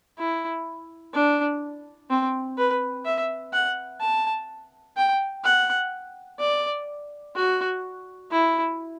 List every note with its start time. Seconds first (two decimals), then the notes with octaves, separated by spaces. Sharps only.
0.18 E4
1.14 D4
2.10 C4
2.58 B4
3.05 E5
3.53 F#5
4.00 A5
4.97 G5
5.44 F#5
6.39 D5
7.35 F#4
8.31 E4